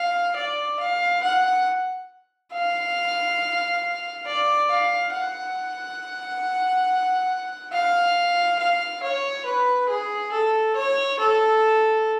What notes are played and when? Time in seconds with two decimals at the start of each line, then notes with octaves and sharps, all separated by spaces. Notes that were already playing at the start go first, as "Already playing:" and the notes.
Already playing: F5
0.36 D5
0.80 F5
1.23 F#5
2.53 F5
4.26 D5
4.69 F5
5.13 F#5
7.73 F5
8.59 F5
9.03 C#5
9.46 B4
9.89 G#4
10.32 A4
10.76 C#5
11.20 A4